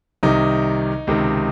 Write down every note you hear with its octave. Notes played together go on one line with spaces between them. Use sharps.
C2 C3 D#3 D#4
C#2 C3 D#3